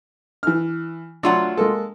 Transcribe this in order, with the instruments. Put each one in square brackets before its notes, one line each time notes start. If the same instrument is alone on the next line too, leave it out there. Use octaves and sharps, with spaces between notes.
[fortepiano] E3 F6
[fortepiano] F#3 D4 [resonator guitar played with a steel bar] A3 F4 F#5
[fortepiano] G#3 A#3 A4